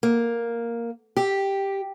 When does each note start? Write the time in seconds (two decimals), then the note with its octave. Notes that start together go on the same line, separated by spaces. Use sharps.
0.03 A#3
1.17 G4